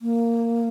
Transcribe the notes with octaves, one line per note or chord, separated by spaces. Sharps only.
A#3